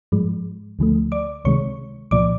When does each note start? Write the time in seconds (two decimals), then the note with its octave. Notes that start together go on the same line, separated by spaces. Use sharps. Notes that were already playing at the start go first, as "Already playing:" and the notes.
0.12 G#2 F3 G#3
0.79 D2 D3 F3 A3
1.12 D5 D6
1.45 C#2 C3 D#3 G#3 C#5 C#6
2.11 C2 A#2 F3 D5 D6